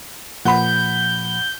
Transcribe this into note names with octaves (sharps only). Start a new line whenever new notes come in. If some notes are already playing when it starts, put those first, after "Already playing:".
A#2 F3 F#5 B5 G6